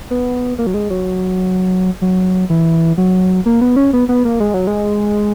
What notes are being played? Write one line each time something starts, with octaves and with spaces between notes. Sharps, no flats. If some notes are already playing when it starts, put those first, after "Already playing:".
B3
A#3
F#3
G#3
F#3
F#3
E3
F#3
A#3
B3
C#4
B3
B3
A#3
G#3
F#3
G#3